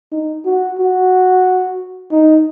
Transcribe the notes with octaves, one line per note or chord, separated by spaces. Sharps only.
D#4
F#4
F#4
D#4